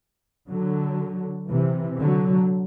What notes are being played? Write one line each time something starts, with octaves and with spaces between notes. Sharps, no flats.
D3 F#3
C3 E3
D3 F#3